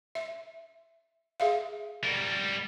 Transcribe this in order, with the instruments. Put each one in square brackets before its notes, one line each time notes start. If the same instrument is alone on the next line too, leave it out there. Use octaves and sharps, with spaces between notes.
[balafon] E5
G#4 E5 F5
[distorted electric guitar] G3 A#4